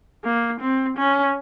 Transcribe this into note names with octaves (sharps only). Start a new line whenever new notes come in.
A#3
C4
C#4